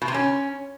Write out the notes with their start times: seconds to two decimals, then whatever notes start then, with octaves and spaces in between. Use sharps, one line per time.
0.02 B2
0.08 C3
0.14 C#4